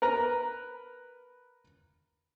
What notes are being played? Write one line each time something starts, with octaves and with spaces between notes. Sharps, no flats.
A#4 B4 A#5